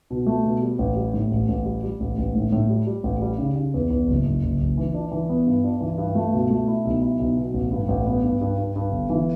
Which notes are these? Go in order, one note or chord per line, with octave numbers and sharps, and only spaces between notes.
B2
A3
B2
G3
A1
G3
A2
A1
A1
G3
G3
A1
A1
A2
A2
G3
G3
A1
G3
C#3
C#3
E2
E2
F#1
F#1
F#1
F#1
E3
D4
E3
B3
G2
D4
E3
G2
A3
B2
A3
E4
B1
E4
B1
B2
A1
G2
A1
B3
G2
G2
G2
G2
G1
E3